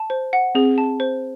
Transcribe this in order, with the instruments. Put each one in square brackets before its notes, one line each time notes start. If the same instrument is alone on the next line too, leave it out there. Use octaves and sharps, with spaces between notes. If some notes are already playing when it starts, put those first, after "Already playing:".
Already playing: [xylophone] A5
C5
F#5
[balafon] C4 [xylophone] G#4
[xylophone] A5
C5